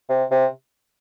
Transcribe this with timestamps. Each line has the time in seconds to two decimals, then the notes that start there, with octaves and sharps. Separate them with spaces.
0.09 C3
0.31 C3